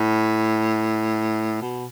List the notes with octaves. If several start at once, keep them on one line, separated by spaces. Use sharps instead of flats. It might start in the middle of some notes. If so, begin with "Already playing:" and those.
Already playing: A2
B2